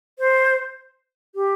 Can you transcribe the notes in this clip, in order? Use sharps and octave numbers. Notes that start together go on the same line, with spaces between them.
C5
G4